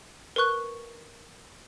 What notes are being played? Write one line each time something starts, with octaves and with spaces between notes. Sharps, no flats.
A#4 B4 C#6 F#6